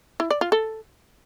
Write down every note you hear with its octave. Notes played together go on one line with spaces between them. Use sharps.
E4
D5
F4
A4